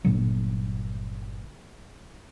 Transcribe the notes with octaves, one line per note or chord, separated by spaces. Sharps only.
G1 A#2 D3 F#3